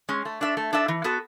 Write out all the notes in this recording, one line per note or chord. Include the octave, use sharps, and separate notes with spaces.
G#3 C#4
A3
D4 A4 E5
A3
D4 A4 E5
E3
B3 F#4 A4